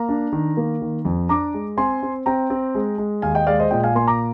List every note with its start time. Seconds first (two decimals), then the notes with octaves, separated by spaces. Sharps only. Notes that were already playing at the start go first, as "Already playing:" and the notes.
Already playing: A#3 A#5
0.09 D4
0.32 D#3
0.57 A#3
0.82 D#3
1.05 F2
1.29 D4 A#5 D6
1.54 G#3
1.77 C4 G#5 C6
2.03 C4
2.26 C4 G5 A#5
2.50 C4
2.75 G#3
2.98 G#3
3.22 D#2 F5 G#5
3.35 D#5 G5
3.47 G#3 D5 F5
3.59 C5 D#5
3.71 A#2 D#5 G5
3.83 F5 G#5
3.95 A#3 G#5 C6
4.07 A#5 D6